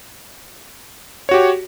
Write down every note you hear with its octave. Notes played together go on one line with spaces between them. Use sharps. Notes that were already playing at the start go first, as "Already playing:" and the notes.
F#4 G4 C#5